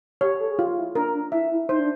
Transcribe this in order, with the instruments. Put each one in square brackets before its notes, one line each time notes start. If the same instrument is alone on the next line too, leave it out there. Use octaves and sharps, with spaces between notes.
[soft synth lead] G4 [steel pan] C#5
[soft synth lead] A4
G#4
[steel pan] F4 [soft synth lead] G4
[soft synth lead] E4
[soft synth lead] D4 [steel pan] A#4
[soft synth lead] D4
[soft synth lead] E4 [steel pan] E5
[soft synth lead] E4
[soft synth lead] D#4 [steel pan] C5
[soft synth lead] D4